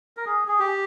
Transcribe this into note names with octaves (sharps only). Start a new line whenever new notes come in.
A#4
G#4
G#4
G4